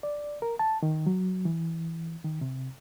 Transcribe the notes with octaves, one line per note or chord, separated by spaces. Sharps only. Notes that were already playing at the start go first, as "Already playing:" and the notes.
D5
A#4
A5
D#3
F#3
E3
D#3
C3